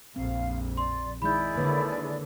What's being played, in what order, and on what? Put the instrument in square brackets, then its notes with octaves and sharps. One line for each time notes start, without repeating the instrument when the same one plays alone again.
[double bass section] A#1 F2 [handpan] C4 [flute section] F5
[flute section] D5 [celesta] C6
[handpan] D#3 G#3 D#4 [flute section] E4 G#4 D5 [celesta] B5 G6
[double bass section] D3 [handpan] A#3 B4 C#5